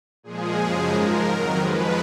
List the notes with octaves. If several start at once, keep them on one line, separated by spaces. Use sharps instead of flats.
A#2 F3 G#3 G#4
F#2 C#3 F3 G#3
G#2 F3 G#3 A#4
F2 D#3 F#3
F2 F3 G#3 B4